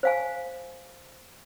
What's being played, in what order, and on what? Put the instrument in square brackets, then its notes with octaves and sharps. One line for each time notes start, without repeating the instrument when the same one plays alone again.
[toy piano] C5 F5 G#5